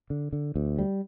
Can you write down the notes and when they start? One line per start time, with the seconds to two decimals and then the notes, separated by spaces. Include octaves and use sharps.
0.10 D3
0.33 D3
0.56 D2
0.78 G3